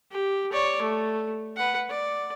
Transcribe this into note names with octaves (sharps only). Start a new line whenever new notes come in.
G4
C#5 D5
A3
B4 F#5
D5